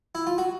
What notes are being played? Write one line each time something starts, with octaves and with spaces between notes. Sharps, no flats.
E4
F4
F#4